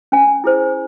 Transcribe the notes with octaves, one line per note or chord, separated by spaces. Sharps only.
C#4 G#5
E4 G#4 C5